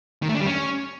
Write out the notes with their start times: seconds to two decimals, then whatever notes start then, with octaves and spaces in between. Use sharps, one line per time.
0.23 D#3
0.29 A3
0.34 D4
0.40 G3
0.46 C#4